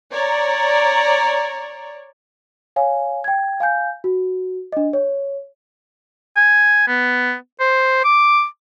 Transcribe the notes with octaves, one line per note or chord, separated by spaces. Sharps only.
C#5 D5 A#5
C#5 F5 G#5
G5 G#6
F5 G#5 G6
F#4
D4 D#5
C#5
G#5
B3
C5
D6